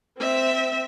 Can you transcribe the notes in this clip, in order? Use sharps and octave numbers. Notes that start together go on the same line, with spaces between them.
C4 E5